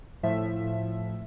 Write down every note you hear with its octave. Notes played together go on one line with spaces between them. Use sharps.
A2 F3 E5